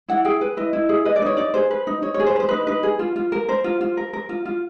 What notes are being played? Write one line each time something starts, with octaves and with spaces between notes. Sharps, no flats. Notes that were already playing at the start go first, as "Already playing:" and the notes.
E4 F#5
G#4 G5
B4
E4 D#5
E4
G#4
B4 D#5
D5
D#4 C#5
D#4 D5
G#4 C5
B4
D#4
D#4 C#5
C#5
G#4
C5
B4
C5
D#4 B4
D#4 B4
G#4
F4
F4
A#4
A#4 C5
F4
F4
A#4
A#4
F4
F4